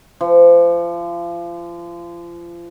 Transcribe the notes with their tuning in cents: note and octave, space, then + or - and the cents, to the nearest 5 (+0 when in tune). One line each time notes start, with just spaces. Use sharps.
F3 -30